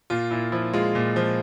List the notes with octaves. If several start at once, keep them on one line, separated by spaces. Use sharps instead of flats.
A#2 F4
A#2 E4
F3 E4
G#3 F4
A#2
F3